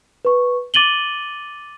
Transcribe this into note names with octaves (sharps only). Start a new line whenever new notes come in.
B4 C#6
D6 A6 D#7 F#7 G7